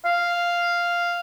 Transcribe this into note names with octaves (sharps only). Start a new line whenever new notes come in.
F5